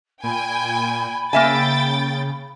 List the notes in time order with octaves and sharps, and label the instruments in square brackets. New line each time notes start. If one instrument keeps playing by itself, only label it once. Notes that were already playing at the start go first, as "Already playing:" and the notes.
[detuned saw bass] A#2 [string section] G5 G#5 [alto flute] B5
[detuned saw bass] C#3 [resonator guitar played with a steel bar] A#3 E5 G#5 [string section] G5 A6